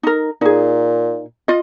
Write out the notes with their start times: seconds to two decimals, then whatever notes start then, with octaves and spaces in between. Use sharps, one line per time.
0.03 D#4 A#4
0.41 A#2 D#4 G#4
1.48 F4 D#5